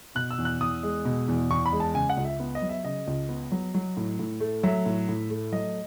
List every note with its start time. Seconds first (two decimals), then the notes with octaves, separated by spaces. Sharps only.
0.15 B2 F#6
0.31 E6
0.38 E2
0.45 F#6
0.60 E2 D#6
0.83 G#3
1.05 B2
1.28 E2
1.50 E2 C#6
1.66 B5
1.72 G#3
1.80 A5
1.94 C#3 G#5
2.10 F#5
2.17 C#2
2.25 E5
2.40 B3
2.55 D#5
2.62 F#3
2.69 E5
2.84 C#3 D#5
3.07 C#2
3.29 B3
3.52 F#3
3.74 F#3
3.97 A2
4.19 A2
4.40 A3
4.63 F#3 E5
4.86 A2
5.08 A2
5.30 A3
5.52 F#3 D#5